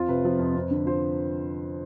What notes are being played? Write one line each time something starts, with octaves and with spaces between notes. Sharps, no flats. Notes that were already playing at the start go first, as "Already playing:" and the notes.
Already playing: F2 F4
C3 B4
F3
F2
F2
D3
F3 C5